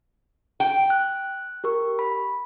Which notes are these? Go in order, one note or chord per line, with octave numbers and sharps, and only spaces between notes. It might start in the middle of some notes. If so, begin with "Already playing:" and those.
G5
F#6
G4 A#4 C#6
B5